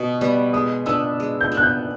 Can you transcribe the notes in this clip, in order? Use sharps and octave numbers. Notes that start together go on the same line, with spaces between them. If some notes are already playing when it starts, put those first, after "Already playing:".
Already playing: B2 C#6 D#6
G3 B3
G#3 D#6
B3 D4 E6
G#3
G6
B3 D4
F#6
G6